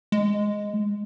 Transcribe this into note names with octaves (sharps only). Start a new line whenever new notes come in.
G#3